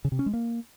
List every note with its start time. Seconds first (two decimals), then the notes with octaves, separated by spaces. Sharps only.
0.05 C#3
0.12 C3
0.19 C#4
0.26 G#3
0.33 A#3